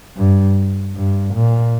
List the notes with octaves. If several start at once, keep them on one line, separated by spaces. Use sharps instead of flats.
G2
G2
A#2